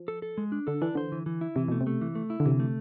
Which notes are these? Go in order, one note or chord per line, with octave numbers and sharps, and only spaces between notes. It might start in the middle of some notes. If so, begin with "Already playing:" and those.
Already playing: F3
A4
A4
G#3
D4
D3 A4
E3 D4
D3 C5
E3
E3
E4
C3 E3
B2 A3
C3
A3
E3
A3
E4
D3
C3 E3
A3